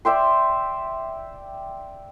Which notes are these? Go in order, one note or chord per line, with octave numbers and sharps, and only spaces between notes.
D5 E5 G5 C6